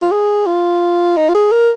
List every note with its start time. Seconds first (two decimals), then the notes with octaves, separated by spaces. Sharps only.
0.02 F4
0.11 G#4
0.46 F4
1.17 D#4
1.29 F4
1.35 G#4
1.52 A#4